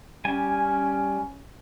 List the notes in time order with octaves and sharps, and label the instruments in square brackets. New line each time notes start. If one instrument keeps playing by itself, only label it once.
[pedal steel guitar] G3 G#5 [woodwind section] C#4